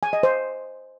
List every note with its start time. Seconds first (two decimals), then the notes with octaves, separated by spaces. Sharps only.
0.03 G#5
0.13 D#5
0.23 C5